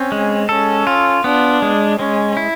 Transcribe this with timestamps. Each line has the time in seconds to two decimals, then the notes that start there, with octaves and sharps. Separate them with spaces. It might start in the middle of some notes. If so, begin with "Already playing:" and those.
Already playing: C4 C#4
0.12 G#3
0.49 C#4 A4
0.87 F4
1.24 B3 D4
1.62 G#3
1.99 G#3 C#4
2.37 E4